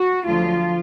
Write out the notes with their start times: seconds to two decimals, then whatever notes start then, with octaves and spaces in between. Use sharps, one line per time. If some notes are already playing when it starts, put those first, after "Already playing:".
Already playing: F#4
0.27 D2 D3 F3 F#3 F4